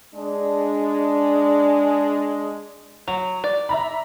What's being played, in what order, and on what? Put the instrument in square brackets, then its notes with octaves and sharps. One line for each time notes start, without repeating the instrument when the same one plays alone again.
[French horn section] G#3 D4
[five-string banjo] F#3 [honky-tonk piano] F7
[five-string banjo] D5
[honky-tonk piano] E5 A#5 B5